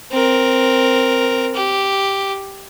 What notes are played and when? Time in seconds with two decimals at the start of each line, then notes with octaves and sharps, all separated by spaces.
0.12 C4 A#4
1.55 G4